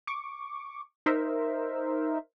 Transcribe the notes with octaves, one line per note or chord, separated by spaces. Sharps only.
C#6 D6
D#4 A#4 C5 E5